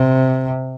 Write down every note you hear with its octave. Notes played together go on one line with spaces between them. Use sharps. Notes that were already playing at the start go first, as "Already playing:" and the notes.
Already playing: C3